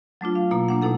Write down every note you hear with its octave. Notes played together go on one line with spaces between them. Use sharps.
F#3 A3 D4 F4
F5
B2 A#3 E4
A#3 D4 F#5
B2 A3 D#4 E4 A4 F#5